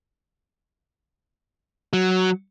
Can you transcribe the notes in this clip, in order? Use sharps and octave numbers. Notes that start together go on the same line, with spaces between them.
F#3